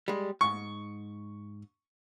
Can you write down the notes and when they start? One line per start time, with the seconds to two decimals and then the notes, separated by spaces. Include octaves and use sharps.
0.08 G3 G#3
0.41 G#2 C#6